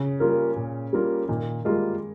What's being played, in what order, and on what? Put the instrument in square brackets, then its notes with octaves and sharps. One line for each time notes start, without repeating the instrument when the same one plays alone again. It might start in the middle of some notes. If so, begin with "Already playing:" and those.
Already playing: [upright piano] C#3
[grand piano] G3 A#3 F4 A#4
A#2
G3 A#3 F4 A#4
[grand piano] A#2 [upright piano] D#3
[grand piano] G3 A#3 F4 A#4 [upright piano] G#3